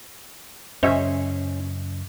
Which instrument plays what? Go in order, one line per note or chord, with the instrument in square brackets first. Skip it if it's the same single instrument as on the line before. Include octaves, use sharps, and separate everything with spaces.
[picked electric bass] F#2 C#3 [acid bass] C#4 [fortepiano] C5 D#5 E5